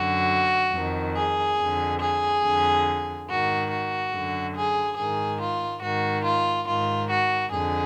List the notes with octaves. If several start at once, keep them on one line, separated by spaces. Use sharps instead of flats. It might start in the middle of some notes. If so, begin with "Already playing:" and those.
Already playing: F#2 D3 F#4
F2 D#3
G#4
F2 D3
G#4
F2 D3
G#2 D#3 F#4
F#4
F#2 D3
G#4
G#2 D#3 G#4
F4
G#2 D#3 F#4
F4
G#2 D#3 F4
F#4
F2 D3 G#4